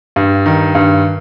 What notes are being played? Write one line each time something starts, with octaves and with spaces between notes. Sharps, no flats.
G2
D#3
G2